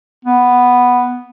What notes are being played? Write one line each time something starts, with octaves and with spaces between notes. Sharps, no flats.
B3